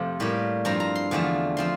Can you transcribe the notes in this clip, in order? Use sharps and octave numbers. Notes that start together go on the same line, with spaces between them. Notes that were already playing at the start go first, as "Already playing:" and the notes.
Already playing: F2 C3 F3 A3 C4
A2 G3 A#3
G2 F3 C4 A#5
A#5
C6
E2 D3 F3 A3
F3 C4 C6